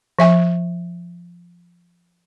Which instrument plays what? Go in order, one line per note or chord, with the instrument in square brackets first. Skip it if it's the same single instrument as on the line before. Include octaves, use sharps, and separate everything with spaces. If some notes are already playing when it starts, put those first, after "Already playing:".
[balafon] F3 E5 G#5